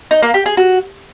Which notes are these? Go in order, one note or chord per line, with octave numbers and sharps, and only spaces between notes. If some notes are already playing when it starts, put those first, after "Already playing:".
D#4
A#3
G4
G#4
F#4